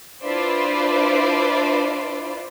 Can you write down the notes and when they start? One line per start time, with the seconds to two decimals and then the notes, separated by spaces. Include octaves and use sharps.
0.23 D4 E4 F4 B4 C5 D5